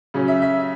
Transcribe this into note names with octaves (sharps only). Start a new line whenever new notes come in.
C#3 F#3 C#4
E5
E5